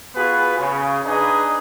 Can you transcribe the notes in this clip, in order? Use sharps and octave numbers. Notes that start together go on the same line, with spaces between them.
B3 F4 F#4 G#4 B4
C#3
D4 D#4 G#4 B4 D#5